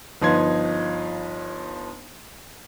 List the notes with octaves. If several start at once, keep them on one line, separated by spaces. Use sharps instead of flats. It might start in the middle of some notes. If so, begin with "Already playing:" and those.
G1 F3 D#4 B4 C6 G#6